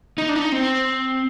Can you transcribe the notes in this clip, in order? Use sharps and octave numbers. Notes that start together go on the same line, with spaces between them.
D#4
D4
D#4
C4